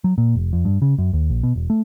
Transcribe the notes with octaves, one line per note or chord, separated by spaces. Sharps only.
F#3
A#2
F1
F2
G2
C#3
F#2
D#2
A#1
B2
E1
A3